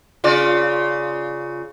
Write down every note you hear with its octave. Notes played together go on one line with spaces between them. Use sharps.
C#3 F4 D5